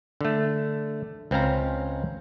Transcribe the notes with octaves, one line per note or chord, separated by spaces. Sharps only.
D3 A3
C#2 C4 C#4 F5 A#5